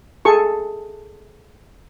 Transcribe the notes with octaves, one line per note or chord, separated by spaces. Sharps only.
G#4 A4 C#6